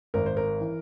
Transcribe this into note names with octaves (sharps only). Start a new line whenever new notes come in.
G#1 A#4
C5
A#4
E3